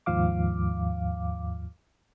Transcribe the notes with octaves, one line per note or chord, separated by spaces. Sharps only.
D#2 G#2 F3 F5 D6